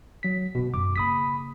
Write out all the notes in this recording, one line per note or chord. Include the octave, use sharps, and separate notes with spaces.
F#3 B6
B2 D3 C4
F#2 D6
C#3 A#3 B5 D#6 B6